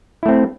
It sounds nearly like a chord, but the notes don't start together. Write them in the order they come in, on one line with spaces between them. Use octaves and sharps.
E4 A3 C4